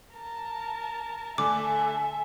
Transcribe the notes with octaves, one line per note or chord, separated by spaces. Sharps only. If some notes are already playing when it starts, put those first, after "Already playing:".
A#4 A5
D3 A3 A4 E5 G#5 D6